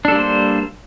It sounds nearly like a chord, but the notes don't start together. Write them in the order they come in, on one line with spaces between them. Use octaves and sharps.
D4 A4 G3 A#3 C5